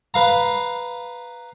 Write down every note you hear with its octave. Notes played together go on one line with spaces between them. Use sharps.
B4 F5 A#5